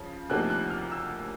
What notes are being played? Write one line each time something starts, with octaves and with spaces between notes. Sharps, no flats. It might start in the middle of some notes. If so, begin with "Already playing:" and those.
Already playing: C#3 F3
D2 C3 F3 A#3 D#4 F#6
F#6
F6
E6